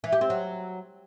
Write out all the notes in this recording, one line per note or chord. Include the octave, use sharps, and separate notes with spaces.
E3
G4
C4
F#3